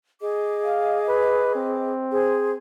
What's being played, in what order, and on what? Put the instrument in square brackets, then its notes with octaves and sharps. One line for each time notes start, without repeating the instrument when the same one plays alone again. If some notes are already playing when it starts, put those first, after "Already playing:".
[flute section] G#4 D#5 D6
[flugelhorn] F5
B4
C4
[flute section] G#4 C5